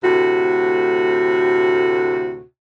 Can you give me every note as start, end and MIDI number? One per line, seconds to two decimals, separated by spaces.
0.03 2.43 38
0.03 2.43 45
0.03 2.43 48
0.03 2.43 66